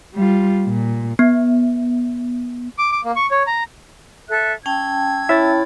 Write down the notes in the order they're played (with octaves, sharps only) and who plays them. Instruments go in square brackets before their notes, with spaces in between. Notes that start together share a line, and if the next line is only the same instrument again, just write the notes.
[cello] G3 F4
A#2
[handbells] B3
[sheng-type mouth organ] D6
D6
A#3
C#6
C#5
A#5
[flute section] A4 E5 F#6
[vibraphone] C#4 G5 A5 [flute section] E6 G#6
[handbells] E4 C#5 A6 [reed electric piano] E5